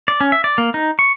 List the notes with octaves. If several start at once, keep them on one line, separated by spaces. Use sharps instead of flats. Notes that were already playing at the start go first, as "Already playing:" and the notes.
D5
C#4
E5
D5
A#3
D#4
C#6